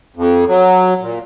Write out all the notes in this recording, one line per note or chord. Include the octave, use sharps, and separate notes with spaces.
F2
F#3
A#2